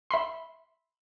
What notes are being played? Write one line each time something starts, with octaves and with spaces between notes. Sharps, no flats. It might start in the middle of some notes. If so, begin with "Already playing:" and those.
E5 B5 C6